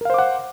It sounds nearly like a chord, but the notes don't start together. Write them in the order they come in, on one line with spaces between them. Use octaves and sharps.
A#4 F5 C5 D6 F#5